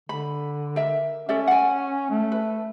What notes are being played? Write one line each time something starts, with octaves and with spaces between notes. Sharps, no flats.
D3 B5
A#4 E5
C#4 A4 D5 E5
F#5 G#5
A3
B4